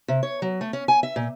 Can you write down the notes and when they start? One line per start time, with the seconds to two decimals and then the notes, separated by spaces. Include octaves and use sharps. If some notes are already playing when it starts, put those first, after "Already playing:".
0.08 C3
0.23 C#5
0.42 F#3
0.61 A3
0.73 C#4
0.88 G#5
1.03 E5
1.16 A#2